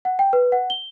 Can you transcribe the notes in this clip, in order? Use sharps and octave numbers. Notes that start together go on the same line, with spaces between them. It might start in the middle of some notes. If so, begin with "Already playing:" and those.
F#5
G5
B4
F#5
G7